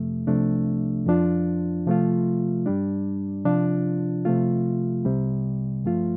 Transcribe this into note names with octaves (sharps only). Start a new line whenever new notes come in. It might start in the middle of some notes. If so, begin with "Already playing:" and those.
Already playing: F2 C3 F3 A3
C2 C3 F3 A3 D4
F2 F3 D4 F4
C3 F3 A3 F4
G2 G3 D4
C3 F3 D4 F4
C3 F3 A3 F4
C2 C3 G3
G2 F3 A3 F4